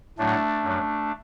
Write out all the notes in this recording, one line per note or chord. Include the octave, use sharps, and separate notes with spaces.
A2 F#3 A3 D4
F#2 F#3